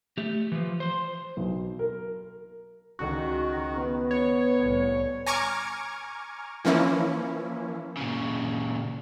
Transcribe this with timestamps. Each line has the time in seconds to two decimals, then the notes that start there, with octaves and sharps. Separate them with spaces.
0.18 A3 G4
0.52 E3 F3
0.80 C5 C6
1.37 B1
1.79 A#4
2.99 C#2 D#3 F#4
3.76 B3
4.11 C#5
4.58 C2 A2
5.26 G#5 A#5 C#6 D6 F6 G#6
6.65 E3 F3 A#3 C#4 E4
7.97 A#2 C#3